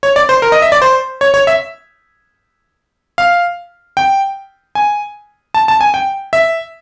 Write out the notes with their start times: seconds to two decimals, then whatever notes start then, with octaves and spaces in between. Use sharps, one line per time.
0.03 C#5
0.16 D5
0.29 C5
0.42 A#4
0.52 D#5
0.62 E5
0.72 D5
0.82 C5
1.21 C#5
1.34 C#5
1.47 E5
3.18 F5
3.97 G5
4.75 G#5
5.54 A5
5.68 A5
5.81 G#5
5.94 G5
6.33 E5